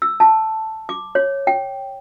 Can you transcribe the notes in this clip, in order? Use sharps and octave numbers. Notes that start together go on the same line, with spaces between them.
E6
A5
D6
C#5
G5